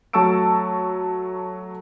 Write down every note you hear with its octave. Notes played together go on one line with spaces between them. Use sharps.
F#3 A3 A5 C#6 E6 D7